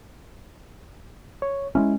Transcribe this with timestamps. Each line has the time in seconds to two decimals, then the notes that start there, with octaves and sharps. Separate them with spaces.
1.42 C#5
1.75 G#3 A#3 C#4 E4